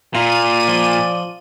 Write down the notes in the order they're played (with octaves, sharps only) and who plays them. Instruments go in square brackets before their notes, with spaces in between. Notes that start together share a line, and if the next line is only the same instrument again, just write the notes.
[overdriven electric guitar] A#2 [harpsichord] F4 A#5 [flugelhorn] D5 [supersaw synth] D#7
[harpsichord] F3